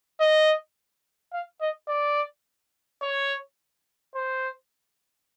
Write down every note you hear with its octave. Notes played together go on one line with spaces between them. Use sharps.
D#5
F5
D#5
D5
C#5
C5